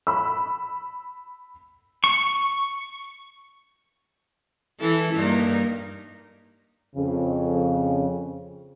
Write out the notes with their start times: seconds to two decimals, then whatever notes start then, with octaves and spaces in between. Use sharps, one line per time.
0.07 B5 E6
2.04 C#6
4.80 E3 E4 A4
5.14 G2 A#3 D#4
6.95 F2 C#3